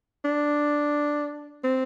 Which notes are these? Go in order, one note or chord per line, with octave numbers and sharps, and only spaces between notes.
D4
C4